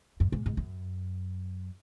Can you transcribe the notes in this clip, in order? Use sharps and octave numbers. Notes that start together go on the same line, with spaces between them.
F#2
G#2
G#2
F#2